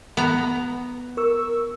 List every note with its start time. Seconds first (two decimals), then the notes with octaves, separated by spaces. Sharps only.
0.17 B3 A#5
1.17 A#4 C#6 E6